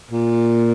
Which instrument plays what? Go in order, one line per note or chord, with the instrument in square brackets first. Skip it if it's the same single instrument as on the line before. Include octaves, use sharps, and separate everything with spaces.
[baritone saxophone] A#2